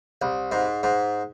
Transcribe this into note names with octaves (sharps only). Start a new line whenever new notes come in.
C2
G#2
G#2